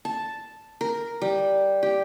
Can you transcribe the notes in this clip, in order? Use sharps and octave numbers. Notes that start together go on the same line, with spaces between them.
A5
A#4
G3
G4